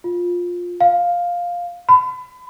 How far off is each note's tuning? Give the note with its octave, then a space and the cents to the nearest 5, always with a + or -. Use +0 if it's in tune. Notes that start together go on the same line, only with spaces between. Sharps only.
F4 +15
F5 +5
B5 +35